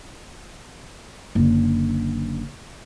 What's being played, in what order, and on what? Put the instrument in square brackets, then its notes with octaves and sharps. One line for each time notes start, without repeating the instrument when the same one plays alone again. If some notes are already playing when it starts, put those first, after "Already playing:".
[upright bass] F#1 D3